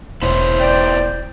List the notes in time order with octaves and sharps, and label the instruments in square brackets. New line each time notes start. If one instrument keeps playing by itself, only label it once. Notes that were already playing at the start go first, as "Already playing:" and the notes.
[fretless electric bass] E1 [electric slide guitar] B3 E4 C#5 [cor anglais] C5
[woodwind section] D5 G5